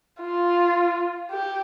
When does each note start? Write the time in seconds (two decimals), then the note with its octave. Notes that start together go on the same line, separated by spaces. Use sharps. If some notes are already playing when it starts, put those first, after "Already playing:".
0.22 F4
1.30 G4